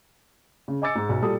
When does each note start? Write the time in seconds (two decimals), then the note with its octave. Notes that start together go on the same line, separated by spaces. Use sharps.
0.68 C#3
0.82 D#5 G#5 D6 E6 A6 C#7
0.95 G#2
1.09 B1
1.22 A#2 G3 A4 D#6